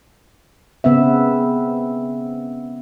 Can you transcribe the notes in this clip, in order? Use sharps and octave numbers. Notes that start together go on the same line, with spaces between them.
C#3 B3 C4 E5